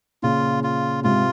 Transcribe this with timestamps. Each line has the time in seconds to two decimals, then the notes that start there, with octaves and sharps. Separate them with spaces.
0.23 A#2 C#3 F4
0.64 F4
1.04 G#2 C3 F4